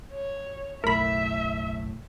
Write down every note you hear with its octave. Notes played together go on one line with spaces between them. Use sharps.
C#5
F#1 B1 A2 A#4 E5 B5